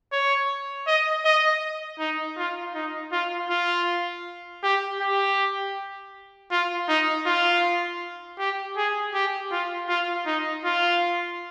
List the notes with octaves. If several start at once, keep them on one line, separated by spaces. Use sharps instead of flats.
C#5
D#5
D#5
D#4
F4
D#4
F4
F4
G4
G4
F4
D#4
F4
G4
G#4
G4
F4
F4
D#4
F4